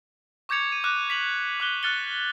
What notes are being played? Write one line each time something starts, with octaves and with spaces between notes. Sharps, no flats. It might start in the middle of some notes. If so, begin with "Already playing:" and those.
C#6 D6 G6 G#6 C#7 F7
D#7
D6 F6 F#6 D#7
B6 F7 F#7
D6 F#6 G7
F6 F#6 A6 C#7 G7